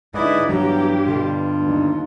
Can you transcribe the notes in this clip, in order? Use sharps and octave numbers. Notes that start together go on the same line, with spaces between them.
G#2 D3 E4 B4 D5 D#5
G2 E3 F#3 B3 G4 A#5
B2 D3 F4 F5
D#2